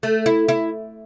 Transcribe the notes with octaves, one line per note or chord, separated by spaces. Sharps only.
A3
E4
E4